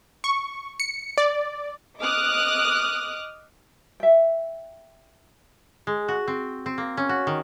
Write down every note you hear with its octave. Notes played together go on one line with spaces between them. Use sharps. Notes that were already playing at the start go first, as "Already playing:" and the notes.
C#6
C#7
D5
D#5 D6 D#6 F6 F#6
E5 G5
G#3
F#4
C4
C4
A#3
C#4
F#4
D#3